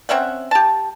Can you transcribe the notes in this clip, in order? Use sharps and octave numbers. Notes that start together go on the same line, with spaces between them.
C4 C#4 E5 F#5
G4 A5